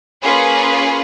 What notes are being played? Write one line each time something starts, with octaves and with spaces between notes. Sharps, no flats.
A#3 C#4 F4 G#4 B4